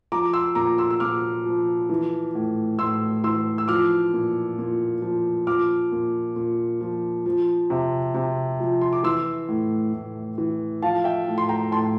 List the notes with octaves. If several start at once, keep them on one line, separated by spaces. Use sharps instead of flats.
F3 A#5 D6
C6 E6
A#2 A#5 D6
C6 E6
E6
A#2 D6 F6
F3
E3
A2
A2 C6 E6
E3 C6 E6
E6
F3 D6 F6
A#2
A#2
F3
F3 D6 F6
A#2
A#2
F3
F3
C3
C3
F3
C6
D6
E3 C6 E6
A2
A2
E3
F3 F5 A5
E5 G5
A2
C6
G5 A#5
A2 A5 C6